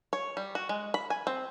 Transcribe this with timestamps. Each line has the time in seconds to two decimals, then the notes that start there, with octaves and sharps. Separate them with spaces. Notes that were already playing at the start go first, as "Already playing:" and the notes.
0.13 C#5
0.37 G3
0.55 F#4
0.69 G#3
0.94 B5
1.10 G#5
1.27 C4